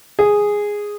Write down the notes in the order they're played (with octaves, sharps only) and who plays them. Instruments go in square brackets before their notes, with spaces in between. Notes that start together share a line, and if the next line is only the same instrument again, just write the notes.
[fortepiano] G#4